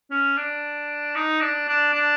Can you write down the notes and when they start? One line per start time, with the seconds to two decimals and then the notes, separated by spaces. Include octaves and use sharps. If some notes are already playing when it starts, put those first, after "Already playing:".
0.11 C#4
0.37 D4
1.16 D#4
1.41 D4
1.68 D4
1.93 D4